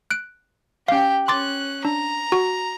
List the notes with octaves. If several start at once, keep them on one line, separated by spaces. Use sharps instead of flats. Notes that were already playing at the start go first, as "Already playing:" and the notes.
F#6 D7
C#4 G4 F5 G5
C#4 C6 D6 F#6 A6
D4 A#5
F#4